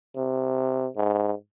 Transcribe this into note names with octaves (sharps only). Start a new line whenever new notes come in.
C3
G#2